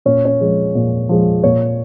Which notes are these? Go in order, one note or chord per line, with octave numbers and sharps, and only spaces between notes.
A#2 C#4
C#4
F3 G#3
A#2
F3 G#3
A#2 C#5